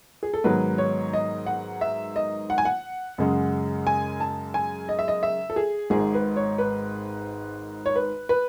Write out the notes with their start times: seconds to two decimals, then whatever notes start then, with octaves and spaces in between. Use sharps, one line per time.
0.23 G#4
0.34 A4
0.44 G#2 D#3 F#3 B3 B4
0.78 C#5
1.13 D#5
1.46 F#5
1.81 E5
2.16 D#5
2.50 F#5
2.58 G#5
2.65 F#5
3.18 F#2 C#3 G#3
3.87 G#5
4.20 A5
4.54 G#5
4.89 D#5
4.99 E5
5.08 D#5
5.23 E5
5.50 A4
5.56 G#4
5.90 G#1 G#2 D#3 G#4
6.14 B4
6.36 C#5
6.58 B4
7.86 C#5
7.96 B4
8.29 B4